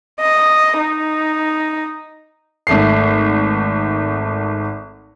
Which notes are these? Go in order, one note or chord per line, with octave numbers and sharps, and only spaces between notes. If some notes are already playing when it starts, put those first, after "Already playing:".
D#5
D#4
G#1 A3 C7